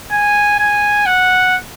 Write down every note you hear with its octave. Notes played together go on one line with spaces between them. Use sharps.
G#5
G#5
F#5